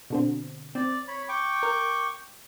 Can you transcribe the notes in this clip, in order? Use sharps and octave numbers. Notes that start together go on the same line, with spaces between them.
B2 D3 C4
C4 D5
C#5 B5
G5 C#6 D6
A#4